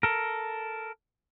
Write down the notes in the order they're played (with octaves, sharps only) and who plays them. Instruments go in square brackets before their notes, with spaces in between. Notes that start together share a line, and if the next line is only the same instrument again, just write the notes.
[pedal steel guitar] A4 A#4